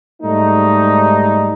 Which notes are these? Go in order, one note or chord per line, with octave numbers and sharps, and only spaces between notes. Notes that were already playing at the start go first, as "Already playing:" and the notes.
G#2 G3 A3 D#4